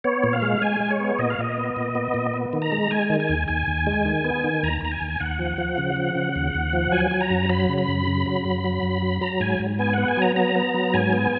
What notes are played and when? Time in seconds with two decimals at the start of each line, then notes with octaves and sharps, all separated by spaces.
0.04 B3 C#5
0.24 A#2
0.33 F5
0.42 G#3
0.61 G#3 G#5
0.80 G#3
0.91 C#5
1.00 B3
1.19 A#2 D#5
1.30 F5
1.39 A#2 D#5
1.57 B3
1.76 A#2
1.95 B3
2.14 A#2
2.33 B3
2.53 D#3
2.62 A#5
2.72 G#3
2.91 G#3 G#5
3.10 D#3
3.20 G#5
3.29 D#2
3.48 D#2 G#5
3.67 D#2
3.87 G#3
4.05 D#3
4.24 B3
4.44 D#3
4.63 D#2 A#5
4.82 D#2 A#5
4.91 G#5
5.01 D#2
5.20 D#2 F#5
5.39 F3
5.58 F3
5.78 C#3
5.96 F3
6.16 C#3
6.36 D#2
6.55 D#2
6.73 F3
6.92 F#3 G#5
7.11 F#3
7.21 A#5
7.30 F#2
7.49 F#3 B5
7.69 C#3
7.78 B5
7.88 F#2
8.07 C#3
8.26 F#3
8.45 F#2
8.64 F#3
8.83 F#2
9.02 F#3
9.21 F#3 A#5
9.40 G#2 G#5
9.59 G#2
9.79 B3 G#5
9.93 B3 F#5
10.08 G#5
10.17 F#3
10.22 A#5
10.36 B3 A#5
10.55 B3
10.74 F#3
10.94 G#2 G#5
11.13 B3